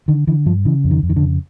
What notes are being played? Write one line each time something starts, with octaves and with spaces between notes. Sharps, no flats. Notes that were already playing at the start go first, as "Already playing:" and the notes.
D3 D#3
D3 E3
G2 F3
C#3 E3
F2
D#3
F2
D#3
D3
C#3